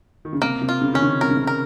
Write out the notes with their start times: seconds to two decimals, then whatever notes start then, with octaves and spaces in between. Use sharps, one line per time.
0.25 D#3
0.33 C#3
0.42 C3 A#3
0.62 C3
0.69 F4
0.81 C#3
0.93 D#3 C#4
1.02 C#3
1.21 C3 A#4
1.29 C#3
1.37 C3
1.47 A#4